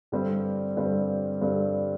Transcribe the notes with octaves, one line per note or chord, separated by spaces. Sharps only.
G2 D3 G3 C4
G2 D3 G3 C4
G2 D3 G3 C4